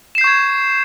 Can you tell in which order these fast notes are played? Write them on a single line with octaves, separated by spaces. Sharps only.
E7 C7 G6 C#6 G#6